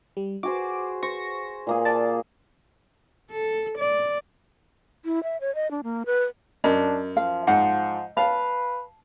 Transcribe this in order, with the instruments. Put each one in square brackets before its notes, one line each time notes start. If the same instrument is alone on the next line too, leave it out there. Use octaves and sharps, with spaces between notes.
[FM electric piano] G3
[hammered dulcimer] F#4 G#4 C5 [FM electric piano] D6
[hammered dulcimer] C5 [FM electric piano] C#6 A#6
[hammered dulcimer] A#2 A#3 G#4
[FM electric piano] D5 A5
[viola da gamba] A4
D5
[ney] E4
E5
C#5
D#5
D4
A#3
B4
[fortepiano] F#2 [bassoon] D4 [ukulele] D#5
[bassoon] F3 [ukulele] F5
[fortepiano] G#2 [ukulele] F#5
[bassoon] B4 [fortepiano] F5 [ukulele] A5